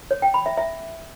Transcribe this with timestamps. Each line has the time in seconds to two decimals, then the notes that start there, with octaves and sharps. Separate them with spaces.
0.11 C#5
0.22 G5
0.34 B5
0.46 E5
0.57 E5